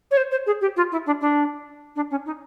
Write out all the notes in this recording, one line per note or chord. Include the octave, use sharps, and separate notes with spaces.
C#5
C5
C5
G#4
G4
F4
E4
D4
D4
D4
C#4
D#4